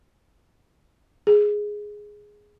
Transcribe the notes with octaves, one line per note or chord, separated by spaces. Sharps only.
G#4